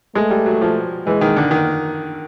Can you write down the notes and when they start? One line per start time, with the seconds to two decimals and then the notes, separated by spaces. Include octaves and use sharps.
0.15 G#3 A3
0.30 G3
0.46 F#3
0.61 F3
1.06 E3 G#3
1.21 D#3
1.36 D3
1.51 D#3